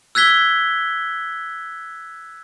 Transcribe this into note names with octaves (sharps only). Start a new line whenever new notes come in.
E6 F#6 G#6 B6 G7